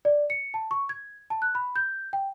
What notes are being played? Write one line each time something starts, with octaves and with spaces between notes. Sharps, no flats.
D5
C#7
A5
C#6
G#6
A5
F#6
B5
G6
G5